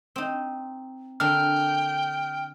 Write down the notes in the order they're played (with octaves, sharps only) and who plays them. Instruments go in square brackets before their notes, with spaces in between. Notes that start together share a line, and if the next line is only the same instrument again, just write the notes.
[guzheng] C4 D#4
[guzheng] D3 D4 A#4 [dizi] G5 [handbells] F6